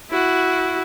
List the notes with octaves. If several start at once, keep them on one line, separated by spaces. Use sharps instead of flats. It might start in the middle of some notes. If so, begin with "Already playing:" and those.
E4 F#4